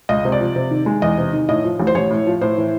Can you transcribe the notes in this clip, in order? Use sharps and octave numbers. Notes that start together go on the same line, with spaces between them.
C#2 D#5
C3
D5
F3
C3
D#3
G#3
E2 D#5
C3
D#3
A2 D#5
F3
A1
C5
A1 C#5
A2
F3
A2 C5
E3